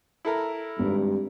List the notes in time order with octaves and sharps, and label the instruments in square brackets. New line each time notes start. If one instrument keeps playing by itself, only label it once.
[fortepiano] E4 A4 A#4
[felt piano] G#1 [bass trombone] G2